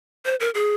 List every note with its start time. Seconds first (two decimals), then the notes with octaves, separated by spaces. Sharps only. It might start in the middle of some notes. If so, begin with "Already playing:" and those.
0.25 C5
0.40 A#4
0.55 G#4